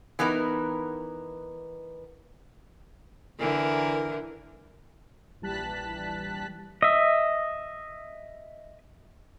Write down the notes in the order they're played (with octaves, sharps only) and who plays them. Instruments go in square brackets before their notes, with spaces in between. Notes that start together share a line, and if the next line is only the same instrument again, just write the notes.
[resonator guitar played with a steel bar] E3 B3 D#4 A#4
[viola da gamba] D3 E3 A#4
[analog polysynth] A#1 E3 G3 A5 F#6 B6
[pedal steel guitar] D#5 E5